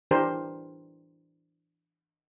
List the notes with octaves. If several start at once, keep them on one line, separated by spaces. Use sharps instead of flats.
E3 D4 G4 A#4 C5